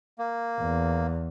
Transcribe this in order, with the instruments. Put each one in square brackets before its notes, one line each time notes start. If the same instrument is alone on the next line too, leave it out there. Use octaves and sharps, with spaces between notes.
[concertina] A#3
[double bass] E2